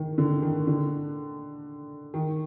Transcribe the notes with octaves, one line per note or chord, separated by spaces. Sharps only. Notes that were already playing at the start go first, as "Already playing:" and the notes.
Already playing: D#3
D3
D#3
D3
D#3